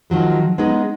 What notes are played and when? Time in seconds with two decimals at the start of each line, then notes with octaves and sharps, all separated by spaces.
0.10 D#3 F3 F#3 G#3
0.58 G#3 B3 C#4 D#4 G#4